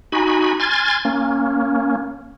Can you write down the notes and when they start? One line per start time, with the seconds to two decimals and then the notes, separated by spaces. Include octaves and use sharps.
0.12 D#4 F#4 G#5 B5
0.60 G#5 C6 F6 G#6 A6
1.05 A#3 C#4